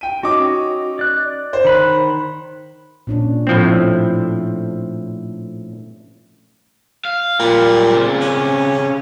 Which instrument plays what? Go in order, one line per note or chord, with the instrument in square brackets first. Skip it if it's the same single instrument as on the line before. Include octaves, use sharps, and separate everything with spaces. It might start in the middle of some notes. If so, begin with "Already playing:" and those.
[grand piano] G5 D#7
[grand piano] C#4 D#4 D6 [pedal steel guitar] F#4
[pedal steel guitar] D5 F#6
[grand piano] C5
[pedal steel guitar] D#3 B5 F#6
[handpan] A#2 C#4 D4
[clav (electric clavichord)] A2 F3 C4 [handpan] A3
[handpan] E5
[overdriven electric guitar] F5
[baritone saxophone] A#2 [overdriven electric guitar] F#3 G3
[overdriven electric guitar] C#3 C4
[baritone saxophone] C#4